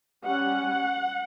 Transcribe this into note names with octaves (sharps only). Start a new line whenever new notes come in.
G3 C#4 F#5